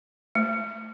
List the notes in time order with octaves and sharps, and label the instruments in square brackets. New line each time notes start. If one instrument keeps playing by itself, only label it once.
[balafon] A3